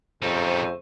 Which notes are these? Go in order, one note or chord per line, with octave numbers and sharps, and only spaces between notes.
F2 C#3 G3 A3 D#4 C5